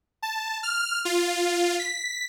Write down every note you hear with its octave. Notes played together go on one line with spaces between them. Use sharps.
A5
F6
F4
B6